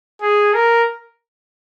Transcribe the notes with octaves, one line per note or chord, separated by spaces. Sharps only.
G#4
A#4